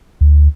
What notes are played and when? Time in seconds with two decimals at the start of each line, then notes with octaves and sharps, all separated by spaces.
0.21 D2